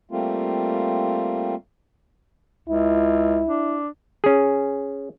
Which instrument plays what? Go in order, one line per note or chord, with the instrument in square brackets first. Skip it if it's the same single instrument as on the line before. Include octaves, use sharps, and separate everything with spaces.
[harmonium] G3 A3 A#3 C4 F4
[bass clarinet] C#2 [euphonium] E4
[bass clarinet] D4
[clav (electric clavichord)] C#4 G#4